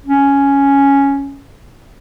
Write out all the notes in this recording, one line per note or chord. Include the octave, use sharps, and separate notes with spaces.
C#4